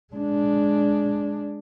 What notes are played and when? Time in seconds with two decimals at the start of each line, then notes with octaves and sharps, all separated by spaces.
0.14 G#3 D4